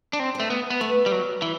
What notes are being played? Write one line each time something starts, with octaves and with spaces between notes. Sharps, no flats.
D4
C4
A3 C5
B3
B3
A3 B4
G3
F#3
E3